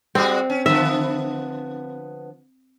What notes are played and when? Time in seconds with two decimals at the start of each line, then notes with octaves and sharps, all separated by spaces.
0.15 G3 G#3 C4 F#4
0.50 C#4
0.66 D3 F3 B3 E5